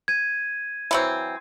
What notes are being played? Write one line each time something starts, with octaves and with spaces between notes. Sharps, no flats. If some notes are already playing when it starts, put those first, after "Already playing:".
G#6 D#7
E3 F#3 C4